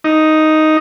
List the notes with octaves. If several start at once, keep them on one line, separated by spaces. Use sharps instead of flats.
D#4